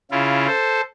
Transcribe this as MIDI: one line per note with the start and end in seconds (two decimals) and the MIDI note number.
0.11 0.47 49
0.11 0.47 64
0.11 0.47 65
0.47 0.81 69
0.47 0.81 72